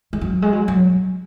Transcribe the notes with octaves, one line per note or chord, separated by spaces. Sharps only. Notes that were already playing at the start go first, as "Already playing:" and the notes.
G#3
F#3
G#3
F#3
F#3